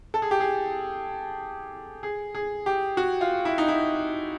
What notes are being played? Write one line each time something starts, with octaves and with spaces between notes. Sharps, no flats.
A4
G#4
G4
G#4
G#4
G#4
G4
F#4
F4
E4
D#4
E4